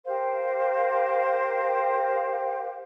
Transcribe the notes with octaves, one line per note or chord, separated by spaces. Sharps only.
G4 A#4 C5 F5